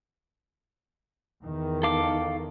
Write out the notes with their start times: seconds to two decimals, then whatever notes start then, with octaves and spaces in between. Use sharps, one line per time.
1.42 E2 D#3
1.83 A4 F5 D6